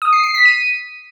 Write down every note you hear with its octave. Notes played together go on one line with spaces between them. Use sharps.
D#6
C7
C7
B6
D#7